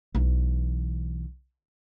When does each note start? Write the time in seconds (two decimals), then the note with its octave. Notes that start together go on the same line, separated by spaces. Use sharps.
0.15 B1 E3